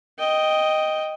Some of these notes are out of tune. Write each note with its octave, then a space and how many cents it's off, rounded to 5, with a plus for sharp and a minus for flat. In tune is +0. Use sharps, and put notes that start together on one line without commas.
D#5 +0 G5 +0